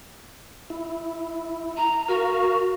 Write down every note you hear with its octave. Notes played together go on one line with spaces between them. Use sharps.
E4
A#5
F#4 A#4 F5